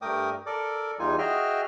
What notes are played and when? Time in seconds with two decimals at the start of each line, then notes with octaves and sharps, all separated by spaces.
0.02 G2 A3 A#4 G5 D6 D#6
0.46 A4 A#4 D5 D6
0.99 E2 E3 G3 D#4 F4 G#5
1.19 F#4 G#4 D#5 E5 G5 F6